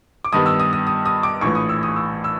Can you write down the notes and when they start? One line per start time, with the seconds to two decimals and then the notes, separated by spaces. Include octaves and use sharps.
0.25 D6
0.32 G2 D#3 G3 B3 D#6
0.46 E6
0.60 D#6
0.73 D#6
0.87 D#6
1.06 D#6
1.23 D6
1.41 A#1 A2 E3 C#6
1.55 D#6
1.69 E6
1.83 D#6
1.96 E6
2.24 E6